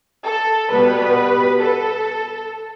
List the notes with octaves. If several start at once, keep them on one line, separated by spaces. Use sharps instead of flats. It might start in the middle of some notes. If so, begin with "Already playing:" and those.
A4
B2 G3 B3 B4
A4